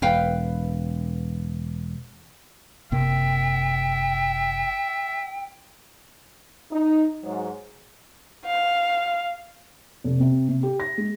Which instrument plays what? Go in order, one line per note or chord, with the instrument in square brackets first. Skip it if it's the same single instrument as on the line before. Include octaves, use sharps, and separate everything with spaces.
[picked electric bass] E1 [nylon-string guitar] B4 F5 G5
[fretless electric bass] F#1 C3 A#3 [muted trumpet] E5 [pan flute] G5
[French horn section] D#4
G#2 F#3
[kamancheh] F5
[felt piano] F1
C3
C3
G4
A#6
G#3